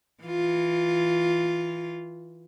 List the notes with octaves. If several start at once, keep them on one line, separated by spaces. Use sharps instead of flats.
E3 F4